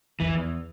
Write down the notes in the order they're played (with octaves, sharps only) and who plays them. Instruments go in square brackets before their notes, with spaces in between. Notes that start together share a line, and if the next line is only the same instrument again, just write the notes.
[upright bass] F2 [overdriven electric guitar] E3
[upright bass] E2